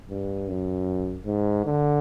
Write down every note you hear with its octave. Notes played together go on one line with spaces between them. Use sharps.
G2
F#2
G#2
D3